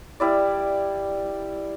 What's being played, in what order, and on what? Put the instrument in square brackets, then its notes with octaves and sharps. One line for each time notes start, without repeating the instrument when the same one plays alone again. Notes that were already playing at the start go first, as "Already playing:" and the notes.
[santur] G3 E4 D5